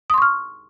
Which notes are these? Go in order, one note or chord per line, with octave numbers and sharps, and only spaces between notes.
C6 C#6 D#6 F6